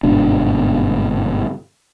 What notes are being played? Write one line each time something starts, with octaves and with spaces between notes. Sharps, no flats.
G1 G#2 B2 D4